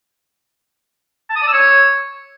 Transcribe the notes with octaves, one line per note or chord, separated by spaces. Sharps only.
A5
D#6
D5
E6
C#5